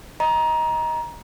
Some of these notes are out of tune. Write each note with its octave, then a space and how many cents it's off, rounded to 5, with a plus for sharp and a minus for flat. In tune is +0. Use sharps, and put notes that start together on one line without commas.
D#5 +10 A#5 +20